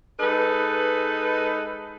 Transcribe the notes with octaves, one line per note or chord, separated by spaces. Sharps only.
G#3 D#4 A4 B4